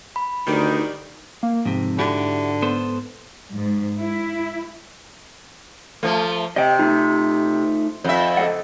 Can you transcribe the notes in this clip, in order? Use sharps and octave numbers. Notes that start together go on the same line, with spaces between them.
B5
D2 D#3 G3 D#4
A#3
F2 G#2 C3
D3 E4 F#4 G4
B3 A4 C5
G#2
E4
F3 A3
C3 D#5 G5
A3 D#4 F4
F2 E5
A4 D#5 F#5